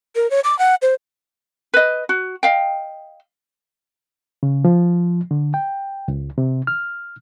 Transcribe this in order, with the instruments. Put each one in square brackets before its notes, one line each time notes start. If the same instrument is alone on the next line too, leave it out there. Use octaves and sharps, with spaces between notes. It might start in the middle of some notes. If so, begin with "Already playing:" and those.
[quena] A#4
C#5
D6
F#5
C5
[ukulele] B4 D#5
F#4
D#5 F5 G5
[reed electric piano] C#3
F3
D3
G5
C#2
C3
F6